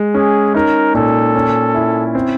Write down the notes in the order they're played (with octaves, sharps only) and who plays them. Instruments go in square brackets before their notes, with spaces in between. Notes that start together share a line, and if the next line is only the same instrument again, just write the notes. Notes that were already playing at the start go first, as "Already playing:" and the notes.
Already playing: [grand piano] G#3
[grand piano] C#4 [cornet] G#4
[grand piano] D#4 [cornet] A#4
[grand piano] A#2 [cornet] A4
[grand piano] C#4
E4
C4